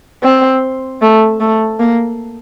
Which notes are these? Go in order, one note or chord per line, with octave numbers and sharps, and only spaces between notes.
C4
A3
A3
A#3